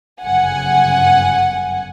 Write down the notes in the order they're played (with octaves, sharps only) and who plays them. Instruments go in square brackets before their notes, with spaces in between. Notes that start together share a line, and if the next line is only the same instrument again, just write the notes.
[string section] G1 F#2 C#3 F#5 G#5